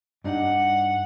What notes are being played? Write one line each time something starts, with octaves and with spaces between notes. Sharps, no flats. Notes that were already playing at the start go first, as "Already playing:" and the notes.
G2 D4 D#4 F#5